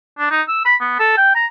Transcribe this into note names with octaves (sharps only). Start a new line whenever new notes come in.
D4
D#4
E6
B5
B3
A4
G5
A#5